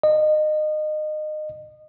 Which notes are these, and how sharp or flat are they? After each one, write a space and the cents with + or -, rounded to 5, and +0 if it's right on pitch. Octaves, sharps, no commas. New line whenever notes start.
D#5 -25